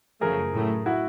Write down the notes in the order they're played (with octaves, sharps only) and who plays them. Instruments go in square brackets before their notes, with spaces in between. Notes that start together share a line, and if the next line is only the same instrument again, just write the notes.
[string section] F#2 C#3 F3 A3 [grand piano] G#4 A#4
[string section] A2 F#3 A3
[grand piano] E4 F#4